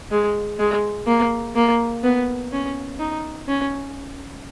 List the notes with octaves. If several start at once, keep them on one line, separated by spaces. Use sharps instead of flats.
G#3
G#3
A#3
A#3
B3
C#4
D#4
C#4